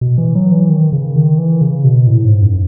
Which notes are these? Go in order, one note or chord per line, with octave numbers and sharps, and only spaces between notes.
B2
E3
F#3
E3
D#3
C#3
D#3
E3
C#3
B2
A2
G#2
F#2